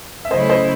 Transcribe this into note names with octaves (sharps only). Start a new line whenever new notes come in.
E5
C#3 F#3 A3 C#4 E4 C5 D#5
C5 D#5